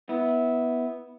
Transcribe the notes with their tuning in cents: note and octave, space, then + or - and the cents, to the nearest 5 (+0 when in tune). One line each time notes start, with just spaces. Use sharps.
B3 +0 E4 -20